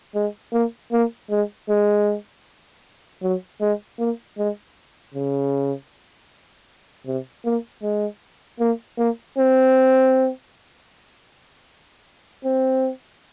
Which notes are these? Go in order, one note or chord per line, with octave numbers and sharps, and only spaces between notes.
G#3
A#3
A#3
G#3
G#3
F#3
G#3
A#3
G#3
C#3
C3
A#3
G#3
A#3
A#3
C4
C4